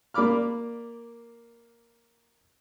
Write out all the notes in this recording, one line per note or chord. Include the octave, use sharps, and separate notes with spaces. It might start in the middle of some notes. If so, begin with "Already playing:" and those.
A#3 D5 B5 D6 F6